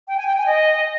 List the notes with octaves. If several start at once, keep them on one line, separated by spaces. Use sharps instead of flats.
G5
G#5
G5
G#5
D#5